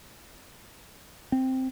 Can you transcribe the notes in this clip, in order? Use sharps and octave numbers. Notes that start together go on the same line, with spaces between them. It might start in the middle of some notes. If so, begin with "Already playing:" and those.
C4